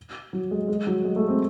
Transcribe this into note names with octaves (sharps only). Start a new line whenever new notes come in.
F#3
G#3
G#3
F#3
G#3
A3
C4